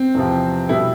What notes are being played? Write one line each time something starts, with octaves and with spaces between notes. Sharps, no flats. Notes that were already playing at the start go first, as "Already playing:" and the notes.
Already playing: C4
E2 C3 F3
B2 G3 E4